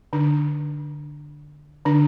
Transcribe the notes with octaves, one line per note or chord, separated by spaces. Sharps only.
D3 D4
D3 D4